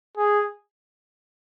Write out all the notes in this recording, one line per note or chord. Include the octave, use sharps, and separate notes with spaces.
G#4